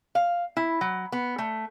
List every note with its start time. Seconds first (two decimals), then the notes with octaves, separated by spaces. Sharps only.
0.15 F5
0.57 E4
0.81 F#3
1.12 B3
1.38 A3